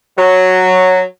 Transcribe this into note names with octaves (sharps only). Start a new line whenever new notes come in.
F#3